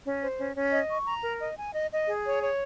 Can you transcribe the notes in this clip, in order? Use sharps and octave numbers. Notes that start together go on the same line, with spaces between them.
C#4
C5
C#4
C#4
D#5
C#6
A#5
A#4
D#5
G#5
D#5
D#5
G#4
C#5
C#5